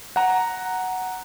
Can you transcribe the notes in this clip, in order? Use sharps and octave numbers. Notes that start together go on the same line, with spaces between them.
F#5 A#5